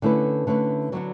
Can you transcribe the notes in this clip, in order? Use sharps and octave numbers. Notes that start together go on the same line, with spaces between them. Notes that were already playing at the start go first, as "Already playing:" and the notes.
D3 A3 C#4 E4 B4
D3 A3 C#4 E4 B4
D3 F#3 B3 D4 F#4